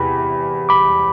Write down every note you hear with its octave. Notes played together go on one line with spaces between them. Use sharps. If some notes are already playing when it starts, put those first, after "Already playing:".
Already playing: E2 C3 B5
B5 D6